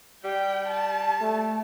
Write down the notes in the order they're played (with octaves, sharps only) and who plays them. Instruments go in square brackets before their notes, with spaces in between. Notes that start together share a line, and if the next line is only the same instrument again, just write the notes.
[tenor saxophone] G3 [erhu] G5
[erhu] A5
[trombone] A3